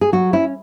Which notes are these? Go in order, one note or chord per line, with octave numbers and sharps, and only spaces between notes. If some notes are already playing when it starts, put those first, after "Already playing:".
G#4
F#3 F#4
C#4 E4